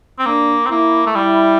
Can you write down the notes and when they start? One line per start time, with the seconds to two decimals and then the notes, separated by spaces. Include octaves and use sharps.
0.19 C4
0.26 A#3 D4
0.66 C4
0.71 A#3 E4
1.06 A3
1.15 G3 E4